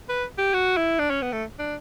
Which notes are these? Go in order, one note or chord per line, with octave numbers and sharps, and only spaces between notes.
B4
G4
F#4
E4
D4
C#4
B3
A3
D4